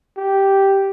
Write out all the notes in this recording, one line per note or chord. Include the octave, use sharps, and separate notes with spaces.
G4